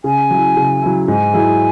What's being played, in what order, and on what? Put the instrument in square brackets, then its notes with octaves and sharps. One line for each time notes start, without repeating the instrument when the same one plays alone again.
[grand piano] C#3 [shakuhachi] G#5
[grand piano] F#3 E4
C#3
F#3 E4
[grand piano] G#2 [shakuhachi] G#5
[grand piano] F#3 E4 G#4